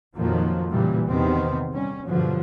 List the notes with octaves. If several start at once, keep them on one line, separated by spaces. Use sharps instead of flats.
F2 A#2 D#3 F3 F#3 A#3
A#2 C#3 E3 G3
E2 C3 D#3 B3 C4
G3 C#4
G2 B2 D3 F3 F#3